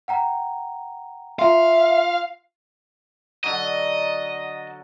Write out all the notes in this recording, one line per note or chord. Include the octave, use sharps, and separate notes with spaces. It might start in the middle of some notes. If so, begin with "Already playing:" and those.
F#5 G5 A#5
F4 E5 F5 C6
D3 F#3 D#5